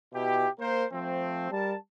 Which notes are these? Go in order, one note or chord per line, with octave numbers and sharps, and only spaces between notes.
B2 E4 G4
A#3 A#4 C5
F3 A3 C4
G3 A#4 A5